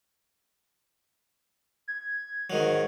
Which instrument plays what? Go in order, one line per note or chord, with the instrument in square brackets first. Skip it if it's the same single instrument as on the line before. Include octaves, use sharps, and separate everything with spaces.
[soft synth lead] G#6
[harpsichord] G#2 D#3 F#3